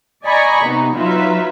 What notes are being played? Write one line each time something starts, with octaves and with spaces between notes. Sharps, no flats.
D5 D#5 G#5 A#5 B5 C#6
C3 B3 D#4
F#3 D#4 F4 B4 E5